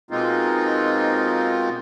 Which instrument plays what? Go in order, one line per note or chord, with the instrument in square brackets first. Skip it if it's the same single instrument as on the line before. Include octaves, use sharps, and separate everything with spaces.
[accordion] B2 G#3 A#3 C4 D#4 F4